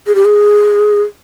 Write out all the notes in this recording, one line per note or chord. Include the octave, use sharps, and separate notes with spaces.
G#4
G4
G#4